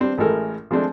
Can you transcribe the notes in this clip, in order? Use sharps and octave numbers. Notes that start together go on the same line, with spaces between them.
G3 C4 D4
A1 A2 G#3 A3 A4 A#4
F3 G#3 A3 C4 D4